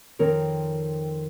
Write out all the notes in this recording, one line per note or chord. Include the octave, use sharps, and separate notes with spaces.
F2 D#3 C4 A#4 C#5